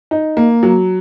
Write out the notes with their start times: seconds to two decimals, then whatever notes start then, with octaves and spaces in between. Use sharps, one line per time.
0.11 D#4
0.37 A#3
0.63 F#3